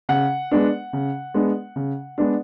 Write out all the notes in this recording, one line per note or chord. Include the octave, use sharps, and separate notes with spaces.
C#3 F#5
G#3 B3 D4
C#3
G#3 B3 D4
C#3
G#3 B3 D4